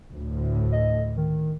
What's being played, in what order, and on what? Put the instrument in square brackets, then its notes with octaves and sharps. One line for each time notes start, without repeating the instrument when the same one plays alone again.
[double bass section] D2 A2
[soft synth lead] D#5
D#3